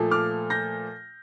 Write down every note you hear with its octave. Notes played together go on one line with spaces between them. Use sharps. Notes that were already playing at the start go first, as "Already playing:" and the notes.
Already playing: A#2 F3 A3
D6 F6
G6 A#6